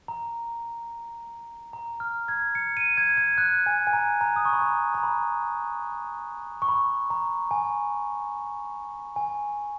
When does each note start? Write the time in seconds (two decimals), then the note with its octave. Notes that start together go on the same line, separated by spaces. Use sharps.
0.08 A#5
1.73 A#5
2.00 F6
2.28 G#6
2.55 C#7
2.77 D#7
2.97 G#6
3.17 G#6
3.38 F#6
3.66 G#5
3.87 G#5
3.93 A#5
4.21 A#5
4.36 D#6
4.45 C#6
4.53 B5
4.62 A#5
4.94 A#5
5.04 B5
6.62 C#6
6.68 B5
7.10 A#5
7.51 G#5
9.16 G#5